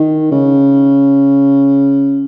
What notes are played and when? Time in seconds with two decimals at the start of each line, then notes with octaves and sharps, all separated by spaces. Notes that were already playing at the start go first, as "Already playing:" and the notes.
Already playing: D#3
0.31 C#3